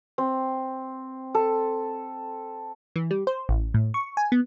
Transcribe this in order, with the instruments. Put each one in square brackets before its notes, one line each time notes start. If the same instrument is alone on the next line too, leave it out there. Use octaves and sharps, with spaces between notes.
[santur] C4
A4
[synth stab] E3
G3
C5
A1
A2
C#6
G#5
B3